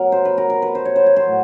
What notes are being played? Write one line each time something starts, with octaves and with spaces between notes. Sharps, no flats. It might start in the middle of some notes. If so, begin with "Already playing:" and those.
Already playing: B2 F#3 A#4
C5
B4
A#4
A#4
B4
C5
C#5
C5
C#5
C5
A2 F#3